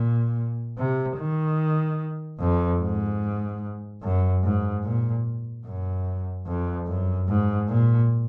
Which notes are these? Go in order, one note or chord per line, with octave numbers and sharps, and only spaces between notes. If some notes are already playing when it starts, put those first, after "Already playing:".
Already playing: A#2
C3
D#3
F2
G#2
F#2
G#2
A#2
F#2
F2
F#2
G#2
A#2